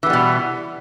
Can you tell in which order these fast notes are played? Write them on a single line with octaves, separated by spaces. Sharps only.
E3 B3 G3 B2